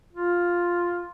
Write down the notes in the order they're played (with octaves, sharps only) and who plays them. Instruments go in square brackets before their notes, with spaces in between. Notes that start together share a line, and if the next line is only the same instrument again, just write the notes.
[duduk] F4